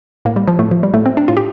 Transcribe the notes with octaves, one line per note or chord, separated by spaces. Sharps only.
A2 A#3
G3
F3
A2 A3
F3
G3
A2 A3
C4
D4
A2 F4
G4